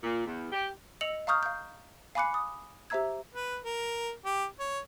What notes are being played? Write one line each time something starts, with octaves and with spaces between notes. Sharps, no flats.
A#2
E2
G4
D#5 E6 C#7 F7 F#7
F5 A#5 C#6 D#6 F6 G6
F5 G6
F5 G#5 B5 D6 F#6 C#7
D#6
G4 C5 E5 A#5 E6 G#6
B4
A#4
G4
C#5